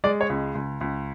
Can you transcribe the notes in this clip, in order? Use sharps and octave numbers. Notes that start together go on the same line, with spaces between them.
G#3 D5
C#5
C#2
C#2
C#2